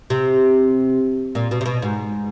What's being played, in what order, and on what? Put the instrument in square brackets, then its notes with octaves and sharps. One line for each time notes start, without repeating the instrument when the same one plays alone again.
[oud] C3
A#2
B2
C3
B2
G#2